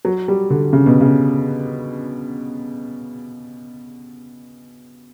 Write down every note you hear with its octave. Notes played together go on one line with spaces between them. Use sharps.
F#3
G3
D3
C#3
B2
C#3